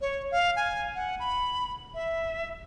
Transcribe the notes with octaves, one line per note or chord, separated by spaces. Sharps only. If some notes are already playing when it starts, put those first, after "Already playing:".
C#5
F5
G#5
F#5
B5
E5